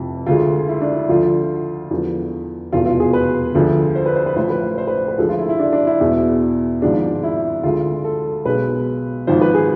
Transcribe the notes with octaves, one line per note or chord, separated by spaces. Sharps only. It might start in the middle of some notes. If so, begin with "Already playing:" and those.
Already playing: F1 F2 C3 F3 E4
D2 D3 G#3 F4
E4
D4
E4
D2 D3 F3 F4
E2 D3 F3
F1 E2 B2 G#3 F4
F4
G#4
B4
D2 D3 F3 G#3
C5
B4
C5
B4
A1 A2 F3 C5
B4
C5
C5
B4
C5
B4
D2 D3 F3 G#3 A4
F4
E4
E4
D4
D4
E4
E2 B2 G#3
G#1 G#2 F3 G#3 D4
E4
D2 D3 G#3 F4
A4
B1 B2 G#3 B4
G#1 G#2 F3 C5
B4
G#4